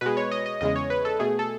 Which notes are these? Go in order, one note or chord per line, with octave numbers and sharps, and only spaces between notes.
B2 G#3 B4
C#5
D#5
D#5
E2 C#3 G#3 D#5
C#5
B4
A4
B2 A3 G#4
A4